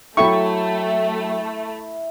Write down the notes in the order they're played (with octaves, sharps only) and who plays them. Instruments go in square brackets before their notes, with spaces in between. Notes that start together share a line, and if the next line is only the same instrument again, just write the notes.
[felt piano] F#3 A4 G5 [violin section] A3 [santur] E4 B5 [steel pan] C#6